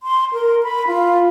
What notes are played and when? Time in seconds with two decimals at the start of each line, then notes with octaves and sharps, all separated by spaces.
0.03 C6
0.33 A#4
0.63 B5
0.87 F4